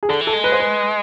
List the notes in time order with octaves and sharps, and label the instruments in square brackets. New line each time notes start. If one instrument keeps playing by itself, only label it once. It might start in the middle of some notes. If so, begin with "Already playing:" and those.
[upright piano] G#4
[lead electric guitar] D3 [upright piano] A4
[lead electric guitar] E3
[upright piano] A4
[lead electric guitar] G#3
[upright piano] B4
C5
B4